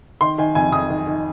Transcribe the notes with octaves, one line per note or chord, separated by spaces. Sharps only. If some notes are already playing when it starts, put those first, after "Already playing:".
D#3 C6
D#3 G#5
F2 G#5
F2 D#6
D#3
D#3